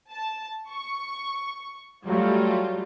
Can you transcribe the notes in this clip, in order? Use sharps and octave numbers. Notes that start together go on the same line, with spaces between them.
A5
C#6
F#3 G3 A3 F4